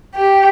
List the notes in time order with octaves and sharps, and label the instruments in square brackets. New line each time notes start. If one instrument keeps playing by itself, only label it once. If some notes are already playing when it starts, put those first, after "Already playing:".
[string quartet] G4